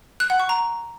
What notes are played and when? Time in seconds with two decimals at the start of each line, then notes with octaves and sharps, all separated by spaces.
0.20 F#6
0.30 F#5
0.40 C#6
0.49 A#5